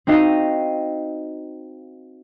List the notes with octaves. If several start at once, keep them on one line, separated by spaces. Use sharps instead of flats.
C4 D#4 F#4 D#5 F5